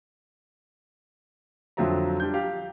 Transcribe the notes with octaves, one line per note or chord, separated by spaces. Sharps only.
F2 D3 F3 F#3 E5 A#5
G3 D4 G6
G4 F5